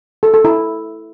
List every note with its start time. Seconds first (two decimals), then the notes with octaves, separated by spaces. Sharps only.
0.23 A4
0.34 A4
0.45 E4